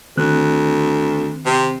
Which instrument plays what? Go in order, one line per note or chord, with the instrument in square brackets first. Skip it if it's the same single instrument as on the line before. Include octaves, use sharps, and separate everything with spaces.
[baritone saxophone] D2 [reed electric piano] D#3 C4 F#6
[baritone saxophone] C3